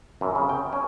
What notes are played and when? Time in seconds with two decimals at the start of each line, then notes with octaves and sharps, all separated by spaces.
0.21 F#2
0.35 C#3
0.49 G5
0.73 C#4